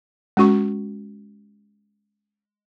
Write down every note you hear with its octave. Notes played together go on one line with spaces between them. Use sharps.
G#3 C#4 F#4 C#6